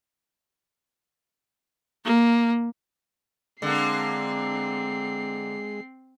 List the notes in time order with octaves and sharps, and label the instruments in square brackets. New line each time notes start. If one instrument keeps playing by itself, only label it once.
[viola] A#3
[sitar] D3 A#3 [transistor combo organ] G#3 [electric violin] C4 C7